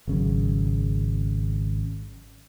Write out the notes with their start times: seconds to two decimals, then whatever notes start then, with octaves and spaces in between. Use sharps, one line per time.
0.08 G#1 C#3 F#3